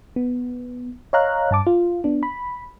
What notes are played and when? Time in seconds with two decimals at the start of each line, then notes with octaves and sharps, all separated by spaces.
0.16 B3
1.13 C#5 D#5 F5 A#5 F#6
1.51 G2 A5 D6
1.67 F4
2.04 B3 D4
2.23 B5